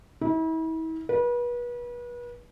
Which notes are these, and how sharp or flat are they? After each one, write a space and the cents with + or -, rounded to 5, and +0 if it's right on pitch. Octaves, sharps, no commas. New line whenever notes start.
E4 -40
B4 -35